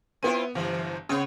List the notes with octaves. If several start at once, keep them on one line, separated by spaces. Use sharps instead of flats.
B3 C4 E4 F4 D#7
G1 C3 E3
C#3 B3 C4 C#5